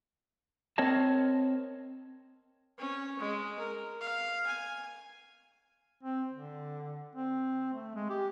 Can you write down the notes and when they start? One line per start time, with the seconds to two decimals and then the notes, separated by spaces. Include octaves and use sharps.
0.78 C4 A#4 C#5 D#5 A5
2.78 C#4
3.19 G#3
3.59 A#4
4.01 F5
4.46 G#5
6.03 C4
6.33 D3
7.15 C4
7.74 A3
7.95 G#3
8.09 G4